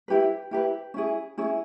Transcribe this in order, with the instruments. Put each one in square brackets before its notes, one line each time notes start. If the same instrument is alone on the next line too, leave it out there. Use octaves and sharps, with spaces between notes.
[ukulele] E4 G4 B4
E4 G4 B4
C#4 E4 G#4
C#4 E4 G#4